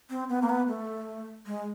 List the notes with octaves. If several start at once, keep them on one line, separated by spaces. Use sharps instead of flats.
C4
B3
A#3
B3
A3
G#3